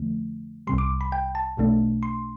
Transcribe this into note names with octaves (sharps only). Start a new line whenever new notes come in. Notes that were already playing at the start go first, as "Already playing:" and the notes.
Already playing: F2 D3 F3 A3
C2 C3 G3 C6
D6
B5
G5
A5
B1 B2 A3 D4
C6